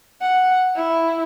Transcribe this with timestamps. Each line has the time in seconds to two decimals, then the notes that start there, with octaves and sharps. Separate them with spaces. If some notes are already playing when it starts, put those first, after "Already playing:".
0.22 F#5
0.76 E4